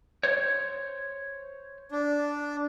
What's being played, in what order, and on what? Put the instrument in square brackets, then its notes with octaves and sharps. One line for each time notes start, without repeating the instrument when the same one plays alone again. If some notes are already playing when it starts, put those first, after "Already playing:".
[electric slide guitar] C5 C#5
[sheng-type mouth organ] D4